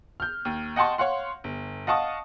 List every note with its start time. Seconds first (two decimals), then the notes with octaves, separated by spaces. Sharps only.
0.20 F6 G6
0.45 D#2
0.76 D#5 F#5 G5 A5 C6 C#6
0.98 C#5 F5 F#5 C6
1.44 G1
1.87 D#5 F5 F#5 A5 C#6 D#6